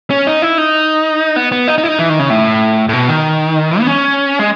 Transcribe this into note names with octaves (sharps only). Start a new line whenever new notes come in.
C#4
D#4
E4
D#4
B3
B3
D#4
D#4
E4
D#4
E3
D#3
C#3
A2
A2
B2
D#3
B3
C#4
G#3